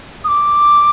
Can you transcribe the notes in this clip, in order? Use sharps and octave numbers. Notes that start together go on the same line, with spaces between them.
D#6
D6